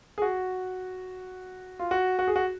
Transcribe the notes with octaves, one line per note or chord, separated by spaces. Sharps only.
G#4
F#4
F4
F#4
F#4
G#4
F#4